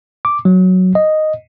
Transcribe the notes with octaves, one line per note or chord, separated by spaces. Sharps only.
D6
F#3
D#5